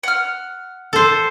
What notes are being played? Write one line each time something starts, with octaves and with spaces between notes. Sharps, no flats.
F#5 F6
A4 C5